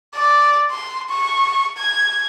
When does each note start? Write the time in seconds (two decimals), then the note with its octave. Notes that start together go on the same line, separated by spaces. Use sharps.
0.15 D5
0.71 C6
1.10 C#6
1.78 G#6